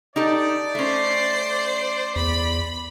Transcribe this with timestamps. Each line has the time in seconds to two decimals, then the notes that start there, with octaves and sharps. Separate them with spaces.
0.16 D#4 G4 A4 D5
0.75 A3 C#4 C5 C7
2.16 E2 B5